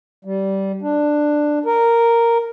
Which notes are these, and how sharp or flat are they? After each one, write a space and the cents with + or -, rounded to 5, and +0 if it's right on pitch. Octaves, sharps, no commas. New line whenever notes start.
G3 -15
D4 +10
A#4 -5